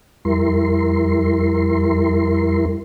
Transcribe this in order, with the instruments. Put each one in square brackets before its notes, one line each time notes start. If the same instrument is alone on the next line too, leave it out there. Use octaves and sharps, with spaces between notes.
[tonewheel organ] F2 G3 E4 A#4 C6